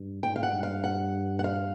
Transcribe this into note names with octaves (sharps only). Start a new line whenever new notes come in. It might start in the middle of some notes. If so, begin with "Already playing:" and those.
Already playing: G2
G#2 G5
F5
F#5
G2
F5
F#5
F#5
F5